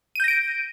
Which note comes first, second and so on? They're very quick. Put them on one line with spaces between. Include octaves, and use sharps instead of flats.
D#7 G6 A#6 D7